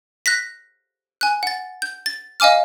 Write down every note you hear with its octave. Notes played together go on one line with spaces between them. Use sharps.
F#6 A#6 B6
G#5 F#6
F#5 A6
G6
A6
D#5 F5 G#5 D6 F6